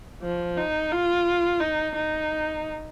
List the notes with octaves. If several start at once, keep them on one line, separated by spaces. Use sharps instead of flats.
F3
D#4
F4
D#4
D#4